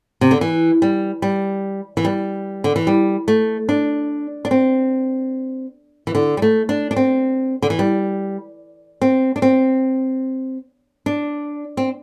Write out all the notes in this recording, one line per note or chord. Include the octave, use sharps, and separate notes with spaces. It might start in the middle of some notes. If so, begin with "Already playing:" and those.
C3
D3
E3
G3
G3
E3
G3
D3
E3
G3
A3
D4
D4
C4
E3
D3
G3
A3
D4
D4
C4
D3
E3
G3
C4
D4
C4
D4
C4